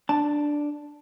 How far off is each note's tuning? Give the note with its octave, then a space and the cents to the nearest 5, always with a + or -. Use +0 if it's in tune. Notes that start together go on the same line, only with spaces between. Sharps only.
D4 +0 A5 +0